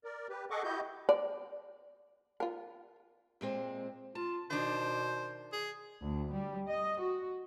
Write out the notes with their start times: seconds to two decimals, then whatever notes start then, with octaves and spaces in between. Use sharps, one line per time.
0.04 A#4 D5
0.29 G4 B4
0.50 G#4 A4 D#5 F#5 C#6 D6
0.64 E4 F#4 G4 D#5 G6
1.09 D5
2.40 F4 A#4
3.41 A#2 G#3 C4
4.15 F4 A5
4.51 B2 D#3 D4 C5
5.53 G#4
6.02 D2
6.32 G3
6.68 D#5
7.01 F#4